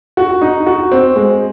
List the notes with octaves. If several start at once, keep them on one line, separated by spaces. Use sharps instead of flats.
F#4
D#4
F#4
C4
G#3